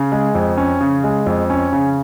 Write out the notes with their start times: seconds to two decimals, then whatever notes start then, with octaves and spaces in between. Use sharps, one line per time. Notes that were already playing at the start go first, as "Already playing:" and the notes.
Already playing: C#3
0.12 G#3
0.35 F2
0.58 C#4
0.81 C#3
1.04 G#3
1.26 F2
1.50 C#4
1.73 C#3